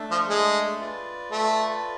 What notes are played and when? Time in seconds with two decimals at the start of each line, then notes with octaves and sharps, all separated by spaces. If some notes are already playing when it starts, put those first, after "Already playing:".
Already playing: A3 D4 A4 E5
0.11 F3
0.28 G#3
0.80 F4 B4 D5
1.32 A3